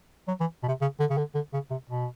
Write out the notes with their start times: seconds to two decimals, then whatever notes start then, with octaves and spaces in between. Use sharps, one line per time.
0.28 F#3
0.40 E3
0.63 B2
0.68 C3
0.81 C#3
1.00 D3
1.10 C#3
1.18 D3
1.35 D3
1.53 C#3
1.70 C3
1.90 B2